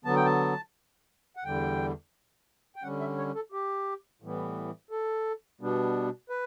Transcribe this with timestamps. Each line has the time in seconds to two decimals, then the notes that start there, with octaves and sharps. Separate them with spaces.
0.05 D3 F#3 B3 A5
0.16 G5
0.25 A5
1.36 F#5
1.45 E2 D3 G3 G5
2.76 G5
2.83 D3 G3 C#4 F#5
3.00 E5
3.18 C#5
3.35 A4
3.52 G4
4.22 A2 E3 G3 B3
4.91 A4
5.61 B2 G3 B3 D4
6.29 B4